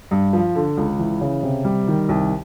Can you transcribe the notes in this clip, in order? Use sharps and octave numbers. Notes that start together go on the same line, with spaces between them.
G2
F3
D3
C#2
E3
C#3
C3
G3
D#3
C2